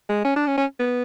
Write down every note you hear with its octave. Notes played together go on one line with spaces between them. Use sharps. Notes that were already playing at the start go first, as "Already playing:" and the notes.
G#3
C#4
D4
C#4
C#4
B3